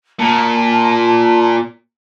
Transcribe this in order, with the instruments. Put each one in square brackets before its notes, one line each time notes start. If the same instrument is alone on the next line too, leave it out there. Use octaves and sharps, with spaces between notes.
[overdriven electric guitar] A#2 [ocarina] A5